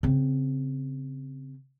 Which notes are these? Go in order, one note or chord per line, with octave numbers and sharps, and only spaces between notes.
C#3 C4